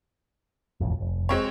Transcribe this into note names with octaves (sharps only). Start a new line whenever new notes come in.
E1 A1 F2
F1
G#3 C4 C#5